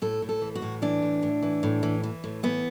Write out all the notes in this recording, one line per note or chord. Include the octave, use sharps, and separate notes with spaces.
A2 A4
A2
A4
E3
F#4
A2
E3 D4
A2
A2
E3
A2
E3
E3
A2
E3 B3